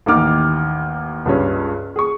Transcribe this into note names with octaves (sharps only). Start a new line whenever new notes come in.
A1 D#2 D#3 D6 F6
C#2 G2 C#4
G#4 C#6